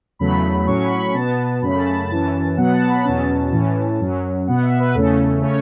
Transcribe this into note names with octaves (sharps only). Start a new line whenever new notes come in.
E2 C#3 F#3 A3 B5
A2 F#3 C#4 C#6
B5
B5
B2 B3 A5
F#2 C#3 A3 C#4 B5
A5
A5
F#2 E3 C#4 A5
B2 F#3 B3 F#5
A5
B5
E2 B2 F#3 C#4 A5
A2 E3 C#4
F#2 F#3 C#4
B2 B3 F#5
E5
B4
E2 C#3 A3 C#4 A4
C#3 A3 C#4 C#5